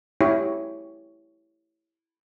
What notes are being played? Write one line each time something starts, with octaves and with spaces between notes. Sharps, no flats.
E4 G4 C#5